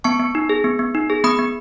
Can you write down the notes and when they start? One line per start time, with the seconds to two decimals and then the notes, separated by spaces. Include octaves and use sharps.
0.04 B3 A5 C#6
0.20 B3
0.35 D#4
0.49 G#4
0.64 B3
0.79 B3
0.95 D#4
1.10 G#4
1.24 B3 B5 D#6
1.39 B3